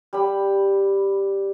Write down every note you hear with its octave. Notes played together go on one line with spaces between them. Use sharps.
G3 B5